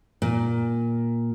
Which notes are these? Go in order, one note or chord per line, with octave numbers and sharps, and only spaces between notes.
A#2